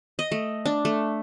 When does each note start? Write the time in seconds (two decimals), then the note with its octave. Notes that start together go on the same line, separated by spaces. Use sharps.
0.19 D#5
0.32 A3
0.66 D4
0.85 A3